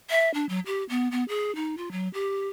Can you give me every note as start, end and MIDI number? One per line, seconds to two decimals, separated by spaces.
0.10 0.33 76
0.34 0.46 62
0.49 0.60 54
0.66 0.84 67
0.89 1.08 59
1.12 1.24 59
1.29 1.55 68
1.55 1.75 63
1.77 1.89 65
1.92 2.08 54
2.14 2.49 67